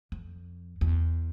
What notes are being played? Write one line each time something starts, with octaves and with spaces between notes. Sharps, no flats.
F2
E2